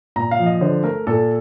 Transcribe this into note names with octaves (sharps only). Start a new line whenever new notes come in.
A#2 A#5
F5
F3
D#5
D3 C5
A3 A#4
A#2 A4